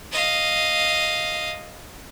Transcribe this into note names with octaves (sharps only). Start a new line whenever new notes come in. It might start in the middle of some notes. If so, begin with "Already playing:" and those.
D#5 F5